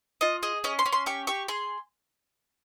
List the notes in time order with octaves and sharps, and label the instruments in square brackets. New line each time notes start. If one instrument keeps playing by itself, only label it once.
[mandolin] F4 D#5
G#4 D#5
C#4 D#5
C6
C#4
C6
G4 C#6
G4 C#6
G#4 C6